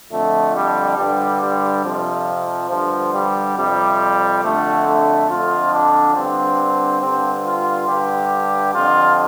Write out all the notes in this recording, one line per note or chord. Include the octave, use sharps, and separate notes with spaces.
F2 D3 A3
G3
G2 D3 G3
G3
F2 C3 F3
G2 D3 F3
G3
F2 C3 G3
F2 D3 A3
A3
F2 D3 F4
D4
G2 D3 C4
G2 D3 C4
F4
G2 D3 G4
F2 D3 F4